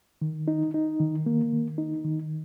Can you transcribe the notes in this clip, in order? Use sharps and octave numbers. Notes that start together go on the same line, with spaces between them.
D#3
D#4
D#4
D#3
A#3
D#3
D#4
D#3